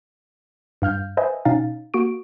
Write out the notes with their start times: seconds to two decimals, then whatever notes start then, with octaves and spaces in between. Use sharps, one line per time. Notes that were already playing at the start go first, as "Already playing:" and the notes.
0.82 G2 F5 F6 G6
1.17 B4 C5 D#5 E5 G#5
1.45 B2 C#4 D#4 F5 A6
1.94 A#3 F#4 C#6 D7